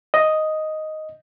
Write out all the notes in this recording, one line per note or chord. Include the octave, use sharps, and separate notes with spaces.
D#5